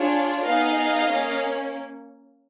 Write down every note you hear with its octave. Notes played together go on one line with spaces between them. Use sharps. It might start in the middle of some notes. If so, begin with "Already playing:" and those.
Already playing: D4 F4 G#4 C#5
B3 D#4 G#4 D#5 F5
A#3 C#4